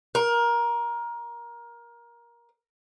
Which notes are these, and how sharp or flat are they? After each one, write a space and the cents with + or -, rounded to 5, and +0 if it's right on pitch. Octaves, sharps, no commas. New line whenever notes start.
A#4 +20